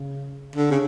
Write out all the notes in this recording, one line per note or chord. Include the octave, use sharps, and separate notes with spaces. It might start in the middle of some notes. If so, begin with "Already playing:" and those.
Already playing: C#3
D3
C#3